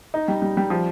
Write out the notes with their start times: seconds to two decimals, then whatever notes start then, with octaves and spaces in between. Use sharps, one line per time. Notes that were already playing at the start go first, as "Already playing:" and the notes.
0.14 D#4
0.28 G3
0.42 G3
0.57 G3
0.70 F3